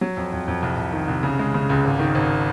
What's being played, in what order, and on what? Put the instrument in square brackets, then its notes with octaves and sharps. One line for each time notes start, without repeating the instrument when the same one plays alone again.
[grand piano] F#3
F2
F2
F2
C2
C2
D#3
C2
C#3
G#3
C#3
C#2
G#1
D#3
G#1